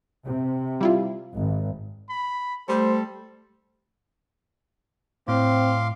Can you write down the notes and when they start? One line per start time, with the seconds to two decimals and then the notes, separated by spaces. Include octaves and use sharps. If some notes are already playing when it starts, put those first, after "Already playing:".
0.24 C3
0.81 G3 E4 F4
1.35 G#1
2.09 B5
2.68 G3 A3 A4 C5
5.28 A2 C4 F5 C6 D6